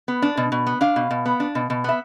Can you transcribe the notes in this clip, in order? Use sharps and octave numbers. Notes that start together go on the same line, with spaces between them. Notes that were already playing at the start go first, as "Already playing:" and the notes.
B3
D4
B2
B2
B3
D4 F5
B2
B2
B3
D4
B2
B2
B3 E5